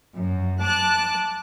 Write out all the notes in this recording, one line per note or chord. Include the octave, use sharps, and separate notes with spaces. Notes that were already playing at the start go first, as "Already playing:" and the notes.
F#2
A5 D6 F#6